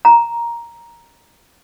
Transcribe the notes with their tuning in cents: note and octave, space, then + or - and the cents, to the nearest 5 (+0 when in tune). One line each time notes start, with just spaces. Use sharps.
A#5 +5